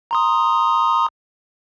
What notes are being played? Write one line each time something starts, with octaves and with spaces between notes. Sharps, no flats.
A#5 C6 D#6